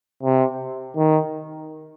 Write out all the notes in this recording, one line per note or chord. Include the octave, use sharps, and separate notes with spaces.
C3
D#3